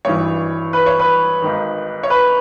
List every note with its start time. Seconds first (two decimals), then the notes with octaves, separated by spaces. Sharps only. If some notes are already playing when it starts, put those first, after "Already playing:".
0.05 G#1 G2 E3 C#5
0.73 B4
0.86 C#5
0.99 B4
1.42 G#1 G#2 D#3
2.03 C#5
2.10 B4